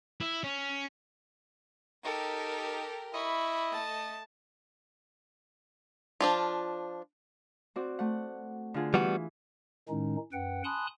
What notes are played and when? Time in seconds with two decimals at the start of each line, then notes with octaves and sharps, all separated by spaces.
0.20 E4
0.44 C#4
2.05 D#4 G4 A4 A#4
3.14 E4 D#5 B5 C#6
3.72 A3 A5
6.21 F3 D4 F4
7.76 C4 F#4 D5
7.99 A3 F#5
8.74 D3 F4 G#4
8.94 E3 G3 B3 F#4
9.89 A2 D#3 G#3 C#4 D#4
10.33 F#2 B4 F#5 G5
10.64 G#5 A5 B5 C6 D#6 F#6